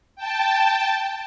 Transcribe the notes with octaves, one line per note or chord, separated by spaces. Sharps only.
G5 A5